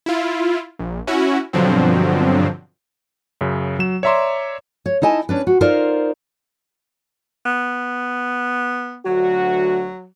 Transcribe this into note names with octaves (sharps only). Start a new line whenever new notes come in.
E4 F4
A#1
C#4 E4 F#4
G2 B2 D3 F3 F#3 C4
F#2 C#3
F#3 E7
C#5 D5 E5 A#5 C6 D6
C#5
D#4 E4 D#5 G#5 A5
C#4 D4 B4
F#4
D#4 F4 A#4 C5 D5
B3
D2 F#3 F#4